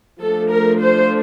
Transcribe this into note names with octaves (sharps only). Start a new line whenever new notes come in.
F3 A3 D4 A4
A#4
C5